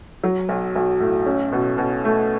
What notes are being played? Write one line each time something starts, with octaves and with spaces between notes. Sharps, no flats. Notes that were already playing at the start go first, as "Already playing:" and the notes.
F#3
B1
B1
A2
C#4
B2
B2
A3